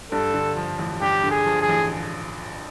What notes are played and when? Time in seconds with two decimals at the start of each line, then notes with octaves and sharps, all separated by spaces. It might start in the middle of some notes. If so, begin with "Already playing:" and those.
0.12 G2 A4
0.34 D3
0.56 F3
0.79 A1
1.01 G2 G4
1.24 D3
1.31 G#4
1.46 F3
1.61 G#4
1.69 A1